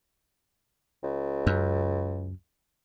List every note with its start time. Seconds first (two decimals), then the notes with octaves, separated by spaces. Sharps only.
1.03 C#2
1.47 F#2